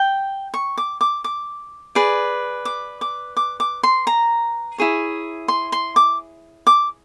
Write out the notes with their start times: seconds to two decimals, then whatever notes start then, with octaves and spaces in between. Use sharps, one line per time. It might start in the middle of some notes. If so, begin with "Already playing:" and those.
Already playing: G5
0.54 C#6
0.78 D6
1.01 D6
1.24 D6
1.95 G#4 B4 D5
2.65 D6
3.01 D6
3.37 D6
3.60 D6
3.83 C6
4.07 A#5
4.78 E4 G#4 C#5
5.48 C6
5.72 C6
5.96 D6
6.67 D6